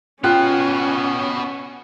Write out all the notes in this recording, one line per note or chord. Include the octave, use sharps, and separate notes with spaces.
B3 C#4 F4 F#4 G5 F#6